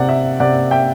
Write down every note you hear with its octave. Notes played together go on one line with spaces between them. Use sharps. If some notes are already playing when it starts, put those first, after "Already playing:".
Already playing: C3 D5 F#5
E5
C3 D5 F#5
E5 G5